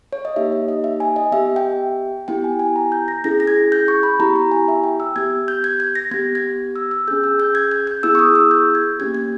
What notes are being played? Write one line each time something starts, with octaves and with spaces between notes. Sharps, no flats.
C#5
D#5
A#3 D#4 G4 E5
D#5
D#5
E5
G#5
D#5
B3 G4 E5
G5
B3 E4 G4 G5
G#5
G#5
A#5
G6
A#6
C#4 E4 G#4 A#6
A#6
G#6
G6
C#6
B5
B3 E4 G4 A#5
A#5
G#5
E5
G5
E6
B3 G4 G#6
G6
G#6
G#6
A#6
B3 G4 G#6
G#6
E6
E6
C#4 G#4 G6
E6
G6
G#6
G#6
G6
B3 E4 G#4 E6
C#6
D#6
E6
G6
G#6
A#3 C#4 G4 G#6
G#6